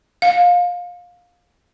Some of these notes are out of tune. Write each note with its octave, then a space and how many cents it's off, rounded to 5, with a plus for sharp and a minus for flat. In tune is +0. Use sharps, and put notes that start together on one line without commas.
F5 +20